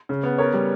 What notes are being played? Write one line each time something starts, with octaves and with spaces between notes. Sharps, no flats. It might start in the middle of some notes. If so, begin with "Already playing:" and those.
C#3
B3
B3 A#4 C#5
G3